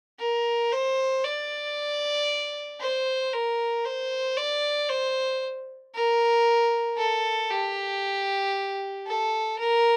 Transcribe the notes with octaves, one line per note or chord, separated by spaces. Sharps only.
A#4
C5
D5
C5
A#4
C5
D5
C5
A#4
A4
G4
A4
A#4